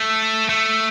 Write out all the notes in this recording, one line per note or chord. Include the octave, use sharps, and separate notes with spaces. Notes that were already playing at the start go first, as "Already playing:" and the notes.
Already playing: A3
A3